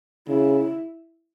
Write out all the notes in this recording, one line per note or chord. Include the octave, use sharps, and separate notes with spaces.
C#3 E4